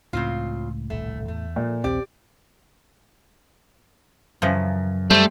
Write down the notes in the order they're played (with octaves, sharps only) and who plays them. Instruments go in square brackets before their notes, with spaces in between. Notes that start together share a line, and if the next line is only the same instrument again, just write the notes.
[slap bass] C#2 [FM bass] A2 [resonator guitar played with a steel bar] C#3 C4 F4
[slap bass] D#1 C2 D3 [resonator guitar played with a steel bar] A3
[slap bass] E2 [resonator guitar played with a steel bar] A3
[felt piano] A#2 [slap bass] F3
[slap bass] A#1 D#2 [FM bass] C4 [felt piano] G4 [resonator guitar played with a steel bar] D5
[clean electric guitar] F#2 [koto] C#3 E3 F3
[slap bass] G3 [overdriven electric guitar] A3 [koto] C5 G5